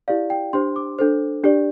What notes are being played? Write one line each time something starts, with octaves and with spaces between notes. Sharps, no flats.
E4 G4 D5 F5
G5
D4 G4 C5 C6
D6
D4 A4 C5
D4 G4 D5